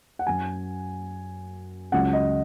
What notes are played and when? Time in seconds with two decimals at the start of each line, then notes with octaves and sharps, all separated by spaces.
0.19 F#5
0.27 F#2 F#3 G#5
1.92 C#2 C#3 F#3 F#5
2.13 D#5